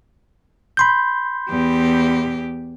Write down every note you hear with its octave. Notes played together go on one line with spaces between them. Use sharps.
B5 C6 G6
E2 G4